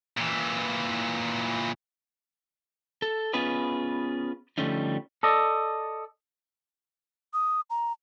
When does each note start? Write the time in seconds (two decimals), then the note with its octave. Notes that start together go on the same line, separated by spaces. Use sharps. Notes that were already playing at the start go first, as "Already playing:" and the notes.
0.17 A#2 E3
3.02 A4
3.33 B3 C#4 F4 G#4 B4 D#5
4.58 D3 F3 G3 A3 C#4 D#4
5.23 A4 D5 D#5
7.34 D#6
7.70 A#5